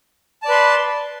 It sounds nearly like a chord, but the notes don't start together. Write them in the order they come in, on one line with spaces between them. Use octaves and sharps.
A5 D5 B4 C6